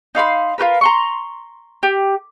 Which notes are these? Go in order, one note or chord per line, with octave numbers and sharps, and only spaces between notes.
D#4 F5 B5 C6
F4 G4 A#4 B4
A#5 C6 C#6
G4